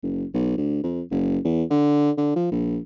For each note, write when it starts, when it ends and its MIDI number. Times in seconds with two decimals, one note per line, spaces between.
0.02 0.25 30
0.34 0.55 35
0.58 0.83 38
0.84 1.02 41
1.11 1.38 30
1.44 1.64 40
1.70 2.11 50
2.18 2.33 50
2.36 2.47 53
2.52 2.79 34